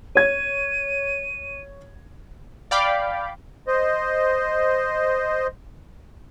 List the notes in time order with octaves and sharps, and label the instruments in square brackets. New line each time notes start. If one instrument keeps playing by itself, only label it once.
[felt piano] C#5 G#6 [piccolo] D#7
[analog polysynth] D5 F5 G5 B5 D6
[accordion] C5 D#5